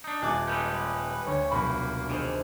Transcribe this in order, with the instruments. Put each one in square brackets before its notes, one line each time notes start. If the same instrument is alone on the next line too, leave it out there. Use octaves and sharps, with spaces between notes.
[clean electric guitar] D4 D#4
[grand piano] D#1 D6 [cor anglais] G#5 [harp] A5 F#6 G#6
[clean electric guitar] G3 G#3 C#4 [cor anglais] B4 [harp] D#6 G6
[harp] D2 [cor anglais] C#5
[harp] F1 B1 [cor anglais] A#3 [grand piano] B5
[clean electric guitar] D#3 E3 [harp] D4 G#4 C5